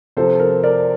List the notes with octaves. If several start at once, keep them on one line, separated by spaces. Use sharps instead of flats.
C3 F3 A4 C5
A#4
A#4 D5